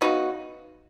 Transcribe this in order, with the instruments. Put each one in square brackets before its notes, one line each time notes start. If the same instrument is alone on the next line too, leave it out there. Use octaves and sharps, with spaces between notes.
[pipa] C#3 F#3 B3 D#4 F#4